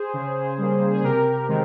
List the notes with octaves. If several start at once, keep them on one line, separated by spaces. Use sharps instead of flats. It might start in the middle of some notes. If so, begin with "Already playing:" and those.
Already playing: G#4 C5
C#3
G3 A#3
G#4
C3 G4 A#4
D#3 G#3 C4